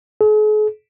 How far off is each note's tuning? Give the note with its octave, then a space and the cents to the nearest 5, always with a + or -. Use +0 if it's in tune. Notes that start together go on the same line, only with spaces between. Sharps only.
G#4 +45